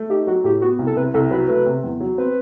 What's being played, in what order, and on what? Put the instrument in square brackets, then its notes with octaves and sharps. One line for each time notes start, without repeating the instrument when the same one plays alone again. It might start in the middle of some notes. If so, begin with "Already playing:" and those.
Already playing: [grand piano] A3
[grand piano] D#4 [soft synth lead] G4
[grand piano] F#3 [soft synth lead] F#4
[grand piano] A2 [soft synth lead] G4
[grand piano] B3 [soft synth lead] F#4
[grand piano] C2
[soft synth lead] A4
[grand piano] C3 [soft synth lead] B4
[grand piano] C2 [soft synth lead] A4
[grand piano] F#3 [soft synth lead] B4
[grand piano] A3 [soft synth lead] B4
[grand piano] C3
E2
F#3
[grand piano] C4 [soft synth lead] B4